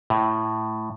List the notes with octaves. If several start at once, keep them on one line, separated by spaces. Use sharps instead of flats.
A2